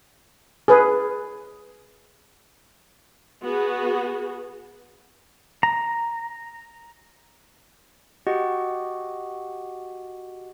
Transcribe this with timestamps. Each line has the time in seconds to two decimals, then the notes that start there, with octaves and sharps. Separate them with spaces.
0.68 G#4 B4
3.44 B3 F#4 G#4
5.63 A#5
8.27 F#4 G4 D#5 F#5